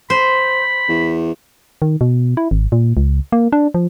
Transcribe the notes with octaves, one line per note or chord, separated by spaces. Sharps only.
C5 B5
E2
D#3
B2
E4
G#1
A#2
C#2
A#3
D4
F3